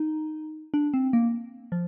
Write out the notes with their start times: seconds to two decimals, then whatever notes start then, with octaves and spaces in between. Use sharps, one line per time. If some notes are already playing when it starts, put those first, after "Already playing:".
Already playing: D#4
0.74 D4
0.94 C4
1.13 A#3
1.72 F3